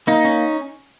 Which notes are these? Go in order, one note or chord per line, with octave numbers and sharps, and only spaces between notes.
A#3 D#4
C#4